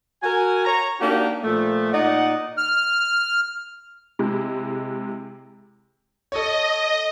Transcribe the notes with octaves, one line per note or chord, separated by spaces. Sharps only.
F#4 A#4 G#5
C#5 A#5
A#3 D4 D#4 F#4 G4
A#2 F3 A3
A#2 D#4 D5 D#5 F#5
F6
C3 G#3 E4
A4 C#5 D#5